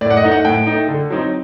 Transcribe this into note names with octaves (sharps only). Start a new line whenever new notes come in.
A2 D5
F#5
D#5
A3 D#4
F#5
A2 G5
A3 D#4
D3
F#3 C4 D#4